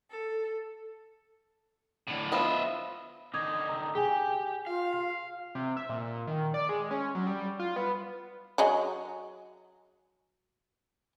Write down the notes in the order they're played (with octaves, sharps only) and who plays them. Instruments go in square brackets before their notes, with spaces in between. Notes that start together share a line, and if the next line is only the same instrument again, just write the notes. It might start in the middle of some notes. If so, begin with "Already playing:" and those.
[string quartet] A4
[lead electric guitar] A2 D3
[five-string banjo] F3 B3 F4 [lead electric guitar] D#5 E5
[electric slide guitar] D3 D#4 [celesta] D6 D#6 G#6
[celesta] A#5 D#6 E6
[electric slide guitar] G4 [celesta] G#4 G#5
[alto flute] F4 [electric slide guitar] F5
[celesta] C7
[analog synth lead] C3
E5
A#2
D#3
D5
G#3
C#4
F#3
G3
F4
B3
[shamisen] F#3 G#4 D#5